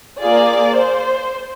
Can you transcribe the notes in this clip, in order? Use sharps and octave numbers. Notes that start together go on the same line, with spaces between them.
A#3 F4 G#4 D5
C5